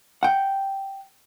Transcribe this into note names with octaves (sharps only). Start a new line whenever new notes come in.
F#5 G5